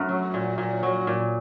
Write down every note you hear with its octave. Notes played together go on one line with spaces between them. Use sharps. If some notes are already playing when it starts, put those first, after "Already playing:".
Already playing: F#2 A3
F#3
A#2
A#2
F#3
A#2